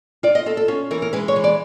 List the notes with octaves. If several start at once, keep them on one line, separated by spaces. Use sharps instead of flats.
F4 D5
D#5
F4 A4
A4
C#4 F4
E3 A#4
A#4
G#3 B4
C#5
E3
D5